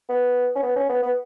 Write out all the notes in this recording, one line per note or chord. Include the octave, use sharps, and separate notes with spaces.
B3
C#4
B3
C#4
B3
B3